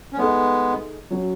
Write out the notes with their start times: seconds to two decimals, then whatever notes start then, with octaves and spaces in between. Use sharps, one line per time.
0.12 C#4
0.17 G#3 A3 B3 D#4 G#4 D#5
1.11 F#3 C#4 F#4